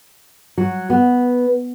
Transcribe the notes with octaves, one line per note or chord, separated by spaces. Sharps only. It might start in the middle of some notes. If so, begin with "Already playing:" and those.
F#3
B3